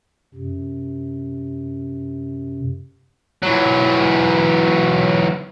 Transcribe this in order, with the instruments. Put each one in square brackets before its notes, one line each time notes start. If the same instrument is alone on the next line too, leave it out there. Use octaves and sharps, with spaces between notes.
[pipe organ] F#2 C3
[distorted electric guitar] E3 F#3